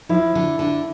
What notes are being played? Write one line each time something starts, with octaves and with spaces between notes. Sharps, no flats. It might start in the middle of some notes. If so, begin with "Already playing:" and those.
F3 E4
D3
D3